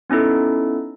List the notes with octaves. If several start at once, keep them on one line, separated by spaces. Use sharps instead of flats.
B3 C#4 D#4 E4 A4